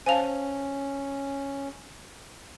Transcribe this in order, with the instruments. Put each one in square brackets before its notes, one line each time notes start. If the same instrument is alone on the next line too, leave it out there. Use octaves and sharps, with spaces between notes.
[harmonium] C#4 [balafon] C5 F5 A5 [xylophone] G#5 F7